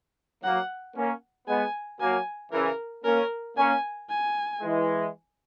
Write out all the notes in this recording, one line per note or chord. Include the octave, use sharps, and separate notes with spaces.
F#3 A#3 F#5
A#3 C#4
G#3 B3 G#5
F#3 A#3 G#5
C#3 E3 A#4
A#3 C#4 A#4
A#3 C#4 G#5
G#5
E3 G#3